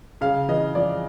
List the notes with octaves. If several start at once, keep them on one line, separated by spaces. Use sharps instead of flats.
C#3 F5
E3 D#5
F2 D5